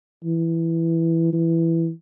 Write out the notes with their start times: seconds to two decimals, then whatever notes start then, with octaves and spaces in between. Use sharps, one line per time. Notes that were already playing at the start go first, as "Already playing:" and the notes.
0.24 E3
1.33 E3